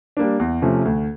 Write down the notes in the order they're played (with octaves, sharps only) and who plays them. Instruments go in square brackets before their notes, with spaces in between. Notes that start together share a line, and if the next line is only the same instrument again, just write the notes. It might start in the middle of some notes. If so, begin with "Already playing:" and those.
[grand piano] G3 A#3 D4
E2
C3 F3 A3 C#4
D2